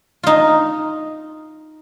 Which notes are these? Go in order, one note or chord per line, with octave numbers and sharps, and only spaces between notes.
D#4 F4